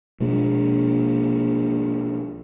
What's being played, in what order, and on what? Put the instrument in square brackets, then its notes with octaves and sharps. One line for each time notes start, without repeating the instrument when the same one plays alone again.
[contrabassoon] A#1 [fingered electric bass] B2 G#3 A#3